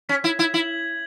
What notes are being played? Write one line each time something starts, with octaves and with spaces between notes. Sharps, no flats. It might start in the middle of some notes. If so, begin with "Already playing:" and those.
C#4 B6
E4 G#6
E4 G#6
E4 F#7